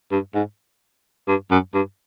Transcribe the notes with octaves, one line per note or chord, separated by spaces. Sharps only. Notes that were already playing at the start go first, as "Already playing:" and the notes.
G2
G#2
G2
F#2
G2